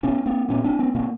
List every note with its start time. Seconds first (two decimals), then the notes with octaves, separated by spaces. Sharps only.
0.03 B2 B3 C#4
0.26 A#3 C4
0.49 A#2 B3 C#4
0.64 C4 D4
0.79 B3 C#4
0.94 B2 A#3 C4